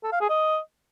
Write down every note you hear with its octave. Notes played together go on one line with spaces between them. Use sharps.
A4
F5
G#4
D#5